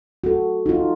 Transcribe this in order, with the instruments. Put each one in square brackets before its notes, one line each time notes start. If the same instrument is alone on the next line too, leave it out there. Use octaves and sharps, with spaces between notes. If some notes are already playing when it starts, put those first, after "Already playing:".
[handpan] F#4 A4
D#4 F4